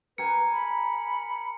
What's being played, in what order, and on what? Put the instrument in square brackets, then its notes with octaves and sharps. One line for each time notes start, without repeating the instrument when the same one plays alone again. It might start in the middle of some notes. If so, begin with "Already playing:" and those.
[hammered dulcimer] A#4 G#5 [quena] B4 [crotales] C#7
[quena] B5